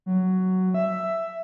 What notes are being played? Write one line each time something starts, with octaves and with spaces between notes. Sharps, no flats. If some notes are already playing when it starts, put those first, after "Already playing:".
F#3
E5